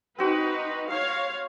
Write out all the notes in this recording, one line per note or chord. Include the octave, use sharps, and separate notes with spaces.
C4 D#4 F#4 B4
C#5 F5